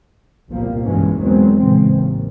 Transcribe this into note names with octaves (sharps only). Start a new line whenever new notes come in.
G1 C2 A#2 F3 G3 A#3
B1 G2 B2 E3 G#3 C#4
E2 B2 D#3 F#3 G#3 C4
A#2 C#3 E3 G#3 C4
A1 D#2